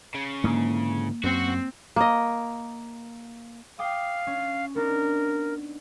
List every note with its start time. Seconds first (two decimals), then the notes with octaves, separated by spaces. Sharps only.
0.14 C#3
0.44 G#2 D3 E3 A#3
1.23 F#2 C4 F#4
1.96 A#3 D#5
3.79 F5 G5 D6 D#6
4.27 C#4
4.75 B3 D4 D#4 A#4